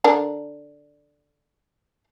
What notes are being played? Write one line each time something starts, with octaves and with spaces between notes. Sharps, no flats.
D3 D4 A#4